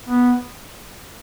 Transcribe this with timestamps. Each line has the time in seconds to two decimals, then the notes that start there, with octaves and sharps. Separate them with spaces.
0.08 B3